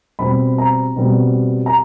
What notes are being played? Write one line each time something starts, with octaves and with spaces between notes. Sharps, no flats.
B2 G3 C4 B5
A#5
B2 G3 C4
A#5